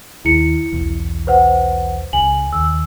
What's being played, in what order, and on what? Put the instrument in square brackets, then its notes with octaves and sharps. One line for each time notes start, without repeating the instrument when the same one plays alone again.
[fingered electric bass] D#2 [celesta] E4 C#7
[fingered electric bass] B1 E2
[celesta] B4 C5 F#5
[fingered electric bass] C#2 [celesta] G#5 F#7
[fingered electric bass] D#2 [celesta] E6